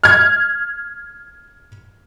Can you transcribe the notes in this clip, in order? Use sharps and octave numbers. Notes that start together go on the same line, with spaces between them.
F6 G#6